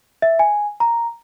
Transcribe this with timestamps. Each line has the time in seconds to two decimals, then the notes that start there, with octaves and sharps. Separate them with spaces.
0.22 E5
0.39 G#5
0.80 A#5